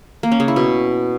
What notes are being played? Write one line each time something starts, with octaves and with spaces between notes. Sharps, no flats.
A#3
C#4
C#3
E4
B2